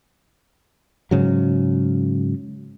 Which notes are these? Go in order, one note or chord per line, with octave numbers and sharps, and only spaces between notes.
G#2 C#3 F#3